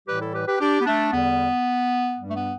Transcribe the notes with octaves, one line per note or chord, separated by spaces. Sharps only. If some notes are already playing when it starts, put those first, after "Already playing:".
A2 E3 G3 G4 B4
E4 A4
G4 B4
G4 B4
D4 G4
B3
A3 D4
E2 D3 G3 B3
G2 G3
A3
B3